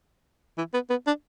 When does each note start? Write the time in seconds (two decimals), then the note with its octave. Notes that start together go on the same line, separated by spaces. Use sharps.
0.58 E3
0.74 B3
0.90 B3
1.07 D4